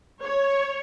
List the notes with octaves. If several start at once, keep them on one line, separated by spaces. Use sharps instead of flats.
C#5